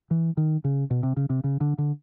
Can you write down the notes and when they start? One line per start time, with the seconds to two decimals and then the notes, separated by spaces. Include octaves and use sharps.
0.11 E3
0.37 D#3
0.64 C#3
0.91 B2
1.03 C3
1.17 C#3
1.30 C3
1.44 C#3
1.61 D3
1.78 D3